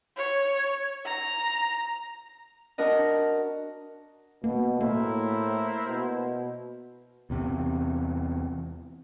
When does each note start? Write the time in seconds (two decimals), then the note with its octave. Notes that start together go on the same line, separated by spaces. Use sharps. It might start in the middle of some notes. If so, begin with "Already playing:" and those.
0.17 C#5
1.05 A#5
2.78 D4 F#4 A#4 D#5
4.44 B2 A#3
4.81 A2 A#3 E4 A#4 C5
5.88 B2
7.30 E2 C3